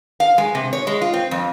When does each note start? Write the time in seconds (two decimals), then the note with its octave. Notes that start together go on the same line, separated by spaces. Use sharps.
0.20 F5
0.38 G#3
0.55 C3
0.73 C#5
0.87 G#3
1.01 F4
1.13 C4
1.31 F2